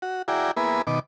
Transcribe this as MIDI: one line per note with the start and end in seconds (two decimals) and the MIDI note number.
0.02 0.22 66
0.28 0.51 64
0.28 0.51 66
0.28 0.51 68
0.28 0.51 74
0.28 0.51 79
0.28 0.51 82
0.57 0.82 58
0.57 0.82 59
0.57 0.82 64
0.57 0.82 68
0.57 0.82 71
0.87 0.99 47
0.87 0.99 51
0.87 0.99 86